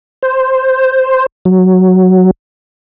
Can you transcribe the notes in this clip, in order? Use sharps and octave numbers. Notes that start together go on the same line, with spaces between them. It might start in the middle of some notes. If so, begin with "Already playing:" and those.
C5
F#3